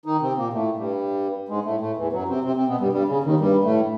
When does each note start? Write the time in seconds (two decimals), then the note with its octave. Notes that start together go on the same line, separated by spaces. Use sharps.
0.05 D#3 D#4
0.21 C3 C4
0.37 A#2 A#3
0.53 A2 A3
0.77 G2 G3
1.48 G#2 G#3
1.65 A2 A3
1.80 A2 A3
1.97 E2 E3
2.13 F#2 F#3
2.28 C3 C4
2.44 C3 C4
2.56 C3 C4
2.68 B2 B3
2.80 G2 G3
2.92 G2 G3
3.08 C#3
3.24 D#2 D#3
3.40 G2 G3
3.64 A2 A3